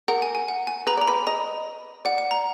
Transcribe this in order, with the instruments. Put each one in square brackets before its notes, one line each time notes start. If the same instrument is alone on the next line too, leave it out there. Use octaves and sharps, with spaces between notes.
[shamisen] A#4 [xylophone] F#5
[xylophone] G#5
G#5
F#5
G#5
[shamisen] B4 [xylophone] A#5
[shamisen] D5 [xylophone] A#5
[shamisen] B4 [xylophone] B5
[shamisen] D#5 [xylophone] A#5
[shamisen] D5 [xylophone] F#5
[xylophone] F#5
A#5